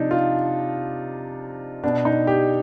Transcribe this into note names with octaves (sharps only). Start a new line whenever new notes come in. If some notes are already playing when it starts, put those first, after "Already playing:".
Already playing: C3 F3 D4 D#4
F4
B2 D4
D#4
G4